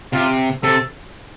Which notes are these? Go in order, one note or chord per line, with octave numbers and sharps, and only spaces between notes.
C3 F4
C3 A4